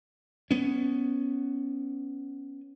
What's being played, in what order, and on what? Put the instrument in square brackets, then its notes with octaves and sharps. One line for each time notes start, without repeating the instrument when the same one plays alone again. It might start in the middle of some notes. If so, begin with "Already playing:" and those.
[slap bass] B3 C#4